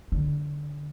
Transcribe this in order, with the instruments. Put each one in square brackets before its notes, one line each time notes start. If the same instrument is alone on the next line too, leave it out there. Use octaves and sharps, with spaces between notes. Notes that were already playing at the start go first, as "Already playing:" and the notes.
[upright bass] D3